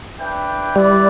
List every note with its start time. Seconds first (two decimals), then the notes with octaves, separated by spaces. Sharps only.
0.21 D4 B4 E5 G5
0.76 G3 E4 B4 D5